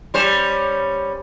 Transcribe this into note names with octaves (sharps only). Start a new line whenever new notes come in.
G3 C#4 C5